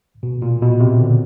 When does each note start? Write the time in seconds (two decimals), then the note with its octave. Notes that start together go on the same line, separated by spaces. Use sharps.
0.23 B2
0.42 A#2
0.62 B2
0.80 C3
1.00 D3